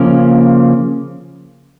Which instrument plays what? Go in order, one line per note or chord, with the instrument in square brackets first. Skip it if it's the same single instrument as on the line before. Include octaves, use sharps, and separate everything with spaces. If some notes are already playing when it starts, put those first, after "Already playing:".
Already playing: [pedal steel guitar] C#3 F3 A#3 C#4